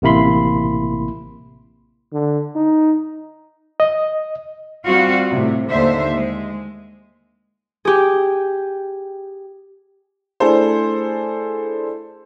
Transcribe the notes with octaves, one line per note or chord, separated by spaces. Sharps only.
A1 C3 A#3 E4 B5 C6
D3
D#4
D#5
G3 C4 F4 F#4 F5
A2 C3
D#2 D3 C5 E5
G#3
G4 G#4
A3 D4 E4 G#4 A4 C5